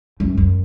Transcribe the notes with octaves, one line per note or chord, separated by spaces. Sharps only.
F#2
F#2